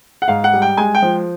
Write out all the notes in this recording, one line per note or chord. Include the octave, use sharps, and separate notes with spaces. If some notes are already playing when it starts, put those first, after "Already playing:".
F#5
G#2 F5
F#5
G3
G5
G#3 G#5
G5
F3